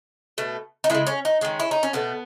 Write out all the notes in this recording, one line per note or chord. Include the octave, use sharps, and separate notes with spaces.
B2 A3
D#4
C#3 G#3 E4
C#4
D#4
D#3 G#3 C#4
E4
D#4
C#4
B2 A3 B3